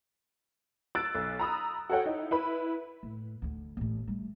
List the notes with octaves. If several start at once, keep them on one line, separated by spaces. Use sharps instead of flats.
E6 F#6 A6 D7
B1
A#5 B5 D#6 E6
F#4 A4 C#5 F#5 G5
D#4 E4
E4 B4 B5
A2
D2 D3
A1 A2
G3 A3